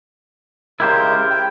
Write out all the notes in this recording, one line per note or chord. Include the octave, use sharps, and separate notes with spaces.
C#3 G#3 E4 G4 A#4 C5
G5